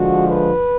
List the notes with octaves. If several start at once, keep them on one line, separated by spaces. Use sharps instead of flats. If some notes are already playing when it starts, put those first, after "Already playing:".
Already playing: D3 F3 G#3 F#4
B4